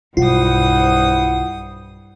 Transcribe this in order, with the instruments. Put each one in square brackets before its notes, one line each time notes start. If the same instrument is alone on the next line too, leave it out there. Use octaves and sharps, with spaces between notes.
[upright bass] B1 [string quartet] G2 D#6 [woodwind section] E4 C5 F#5 [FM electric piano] F4